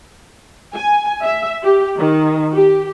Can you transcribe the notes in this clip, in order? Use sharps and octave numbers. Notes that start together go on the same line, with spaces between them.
G#5
E5
G4
D#3
G4